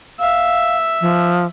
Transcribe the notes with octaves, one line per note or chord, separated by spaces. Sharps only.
E5 F5
F3